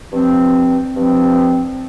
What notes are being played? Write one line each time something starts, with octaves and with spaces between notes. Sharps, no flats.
G2 F3 C4
G2 F3 C4